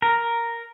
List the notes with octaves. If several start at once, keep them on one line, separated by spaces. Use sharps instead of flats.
A#4